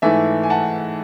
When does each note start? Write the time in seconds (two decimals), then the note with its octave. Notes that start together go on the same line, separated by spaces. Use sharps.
0.02 G#2 E3 A3 E5 G#5
0.43 G#5
0.50 F#5 A5